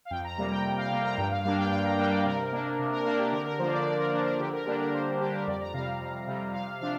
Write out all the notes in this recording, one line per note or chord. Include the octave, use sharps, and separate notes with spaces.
F5
F2 G5
A#5
C3 G3 A#3 A#5
G5
F2
F5
C3 G3 A#3 G5
A#5
G2 G5
F5
G3 A#3 D4 F5
G5
G2 G5
A#5
G3 A#3 D4 G5
D5
C3 A#4
A#3 D4
C3
A#4
A#3 D4 A#4
G4
D3 A#4
A#4
F3 A#3 D4 C5
D5
D3 D5
A#4
F3 A#3 D4 A#4
A#4
D3 G4
A#4
G3 A#3 D4 G4
A#4
D3 C5
G3 A#3 D4 G4
A#4
F2 D5
A#5
C3 G3 F5
F2
C3 G3
C3 F5
F3 D4 F5